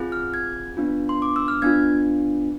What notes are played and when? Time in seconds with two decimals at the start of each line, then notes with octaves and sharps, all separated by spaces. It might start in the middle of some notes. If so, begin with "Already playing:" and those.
Already playing: C4 F4 G#4
0.12 F6
0.34 G#6
0.77 B3 D4 F4
1.09 C6
1.22 D6
1.36 E6
1.48 F6
1.62 B3 D4 F4 G#6